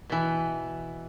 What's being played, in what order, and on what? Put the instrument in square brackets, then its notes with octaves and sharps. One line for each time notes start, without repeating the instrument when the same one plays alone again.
[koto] B2 E3